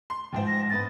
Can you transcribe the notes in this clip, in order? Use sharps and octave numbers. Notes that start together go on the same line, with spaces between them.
C6
A1 D#2 G#2 F3 C5 G5
A#6
A#1 B3 B4 A6